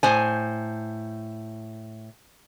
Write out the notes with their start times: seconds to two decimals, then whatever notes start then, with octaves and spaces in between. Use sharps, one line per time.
0.03 A2 C5 G#5